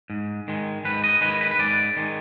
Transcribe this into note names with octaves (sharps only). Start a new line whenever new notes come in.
G#2
D#3 G#3
G#2 B4
D#5
D#3 G#3 B4
B4
B4
G#2 D5
D#3 G#3